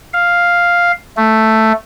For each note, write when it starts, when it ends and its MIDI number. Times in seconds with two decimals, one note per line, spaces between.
0.14 0.92 77
1.17 1.72 57